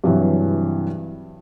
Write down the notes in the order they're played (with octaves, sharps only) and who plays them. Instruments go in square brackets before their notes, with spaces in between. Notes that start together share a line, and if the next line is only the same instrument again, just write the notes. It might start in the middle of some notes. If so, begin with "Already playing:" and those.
[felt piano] G2 C3 E3 F#3